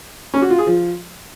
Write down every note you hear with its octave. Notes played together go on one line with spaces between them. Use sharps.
C#4
F#4
F4
G#4
F3